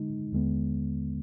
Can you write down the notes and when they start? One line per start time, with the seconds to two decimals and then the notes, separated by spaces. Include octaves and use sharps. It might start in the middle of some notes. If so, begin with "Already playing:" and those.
Already playing: D3 G#3 D#4
0.32 D#2 D3 G#3 B3